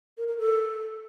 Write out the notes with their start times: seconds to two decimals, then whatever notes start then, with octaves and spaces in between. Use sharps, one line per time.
0.17 A#4
0.28 A#4
0.38 A4